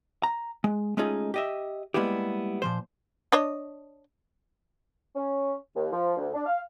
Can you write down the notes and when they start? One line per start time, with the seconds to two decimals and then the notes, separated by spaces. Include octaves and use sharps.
0.23 A#5
0.64 G#3
0.97 G#3 A3 C#4 D#4 F4 G#4
1.34 G4 D#5 E5
1.94 G3 G#3 A#3 B3 E4 G4
2.62 A#2 F3 C5
3.32 D4 C#5 D#5
5.15 C#4
5.76 D#2
5.92 F3
6.17 D2
6.33 D4
6.46 F5